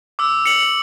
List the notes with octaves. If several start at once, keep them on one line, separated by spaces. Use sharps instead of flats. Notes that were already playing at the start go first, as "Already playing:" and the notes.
D6 E6
C#7 F#7